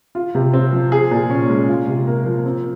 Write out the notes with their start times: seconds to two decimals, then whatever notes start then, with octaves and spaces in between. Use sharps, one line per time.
0.15 F4
0.35 C3
0.54 C4
0.73 F3
0.92 G#4
1.11 A#2
1.30 C#4
1.50 G#3
1.68 F4
1.88 C3
2.07 A#3
2.26 F3
2.45 C4